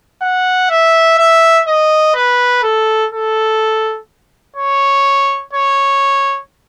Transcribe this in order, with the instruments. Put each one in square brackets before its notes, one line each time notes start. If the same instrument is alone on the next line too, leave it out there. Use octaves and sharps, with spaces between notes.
[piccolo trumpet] F#5
E5
E5
D#5
B4
A4
A4
C#5
C#5